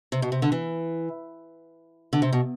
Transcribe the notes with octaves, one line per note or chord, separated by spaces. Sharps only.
C3
B2
C3
D3
E3
D3
C3
B2